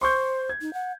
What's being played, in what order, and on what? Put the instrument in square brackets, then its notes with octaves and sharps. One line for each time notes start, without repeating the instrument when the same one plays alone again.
[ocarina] C5 [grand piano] C6 C#6 G6
[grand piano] G#6
[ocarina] D#4
F#5